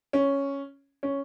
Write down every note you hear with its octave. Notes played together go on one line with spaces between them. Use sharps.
C#4
C#4